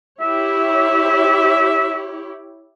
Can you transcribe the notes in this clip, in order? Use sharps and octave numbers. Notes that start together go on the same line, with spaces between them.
E4 G4 C#5 E5